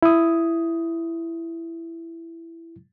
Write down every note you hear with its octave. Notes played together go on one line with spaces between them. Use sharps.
E4 D#6